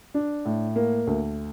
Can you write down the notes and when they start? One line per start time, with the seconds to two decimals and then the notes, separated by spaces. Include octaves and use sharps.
0.14 D4
0.45 A2
0.76 A#3
1.07 D2